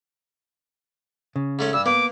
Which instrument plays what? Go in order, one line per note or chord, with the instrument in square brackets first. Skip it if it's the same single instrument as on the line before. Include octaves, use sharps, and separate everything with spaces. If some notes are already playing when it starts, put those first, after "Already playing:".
[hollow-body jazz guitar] C#3
[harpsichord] G#2 A3 C#4
[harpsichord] G2 [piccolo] E6
[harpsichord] A#3 [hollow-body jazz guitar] B3 [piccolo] D6